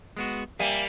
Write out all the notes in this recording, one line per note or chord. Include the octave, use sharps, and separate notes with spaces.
G#3 B3 F#4
G3 A#3 E5 F5 G#5